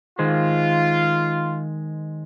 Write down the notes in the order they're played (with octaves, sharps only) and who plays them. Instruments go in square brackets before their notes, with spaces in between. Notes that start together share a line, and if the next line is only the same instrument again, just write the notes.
[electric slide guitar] D#3 G#3 C5 [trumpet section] F4